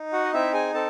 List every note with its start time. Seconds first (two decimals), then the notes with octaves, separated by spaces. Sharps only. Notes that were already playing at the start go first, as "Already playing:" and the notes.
Already playing: D#4
0.13 F#4 F#5
0.24 D#5
0.33 C4 E4 E5
0.53 G#4 G#5
0.74 C4 A4 A5